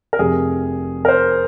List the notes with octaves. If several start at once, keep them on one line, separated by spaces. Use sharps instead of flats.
A#4
F1 F2 C3 G#4
A#4
C5